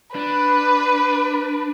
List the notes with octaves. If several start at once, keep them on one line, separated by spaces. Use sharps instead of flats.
D4 B4